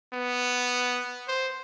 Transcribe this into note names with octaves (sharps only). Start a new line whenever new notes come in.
B3
C5